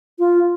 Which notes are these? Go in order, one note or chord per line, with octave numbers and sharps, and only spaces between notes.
F4